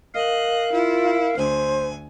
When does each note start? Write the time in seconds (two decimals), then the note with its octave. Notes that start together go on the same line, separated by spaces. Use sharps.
0.15 A#4 D#5 F5 F#6
0.72 E4 F4
1.37 D2 C5 G#5